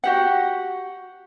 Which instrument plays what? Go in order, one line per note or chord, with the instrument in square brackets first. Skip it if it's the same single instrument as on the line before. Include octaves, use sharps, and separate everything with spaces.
[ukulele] F#4 G4 F#5